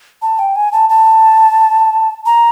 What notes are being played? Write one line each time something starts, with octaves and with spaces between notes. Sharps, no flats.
A5
G5
G#5
A5
A5
A#5